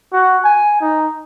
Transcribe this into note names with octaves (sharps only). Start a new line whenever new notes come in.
F#4
G#5
D#4